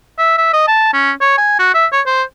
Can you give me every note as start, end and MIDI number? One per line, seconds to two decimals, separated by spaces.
0.18 0.37 76
0.38 0.49 76
0.53 0.66 75
0.68 0.90 81
0.93 1.12 61
1.20 1.37 73
1.38 1.55 80
1.59 1.71 66
1.74 1.86 76
1.92 2.01 73
2.06 2.23 72